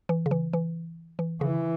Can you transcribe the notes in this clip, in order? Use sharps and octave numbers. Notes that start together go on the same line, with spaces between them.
E3
C#3
E3
E3
E3
C#3 E3